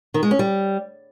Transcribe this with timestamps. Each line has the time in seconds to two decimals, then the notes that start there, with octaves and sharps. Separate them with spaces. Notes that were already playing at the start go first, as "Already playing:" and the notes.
0.14 D#3
0.23 G#3
0.31 C#4
0.39 G3